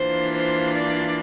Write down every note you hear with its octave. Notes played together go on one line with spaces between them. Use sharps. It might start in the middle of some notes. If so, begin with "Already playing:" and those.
Already playing: E3 A#3 D4 F4 C5
C5
D5